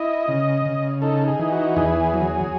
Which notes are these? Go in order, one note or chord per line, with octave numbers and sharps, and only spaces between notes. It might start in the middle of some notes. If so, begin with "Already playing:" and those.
Already playing: E4 D#5
C#3
C#3
D#4 A4
G#4
E3
F#4
E2 G#4
F#3